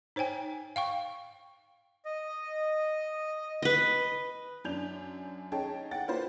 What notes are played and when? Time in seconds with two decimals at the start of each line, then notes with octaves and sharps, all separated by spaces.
0.16 D#4 C5 C#5 G5 G#5
0.76 F5 G5 C#6
2.05 D#5
3.62 B4 D#5
4.64 F#2 D4 G6 F7
5.52 C#4 D#4 G#4 C#5 G5 A5
5.91 F#5 G5 A6
6.08 A#3 F4 B4 C5